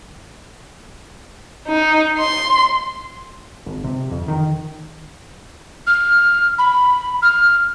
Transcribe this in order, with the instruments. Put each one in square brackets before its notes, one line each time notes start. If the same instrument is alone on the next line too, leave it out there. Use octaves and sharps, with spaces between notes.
[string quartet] D#4
C6
[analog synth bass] G#1
C3
F2
D#3
[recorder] F6
B5
F6